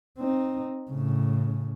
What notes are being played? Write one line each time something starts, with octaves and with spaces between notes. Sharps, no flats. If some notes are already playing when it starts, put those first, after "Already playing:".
C4 D#4
A2 C#3